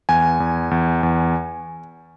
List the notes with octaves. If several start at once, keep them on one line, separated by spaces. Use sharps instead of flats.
E2 G#5
E2
E2
E2